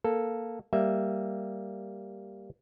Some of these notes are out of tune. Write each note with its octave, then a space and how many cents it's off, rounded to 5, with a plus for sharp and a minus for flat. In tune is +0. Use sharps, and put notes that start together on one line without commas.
A#3 +0 A4 +0
G3 +0 A#3 -5 E5 +0